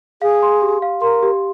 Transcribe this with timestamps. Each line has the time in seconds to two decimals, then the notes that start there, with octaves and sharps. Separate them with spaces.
0.22 G#4 F5
0.43 C6
0.62 G4
0.82 F5
1.02 A#4 C6
1.23 G4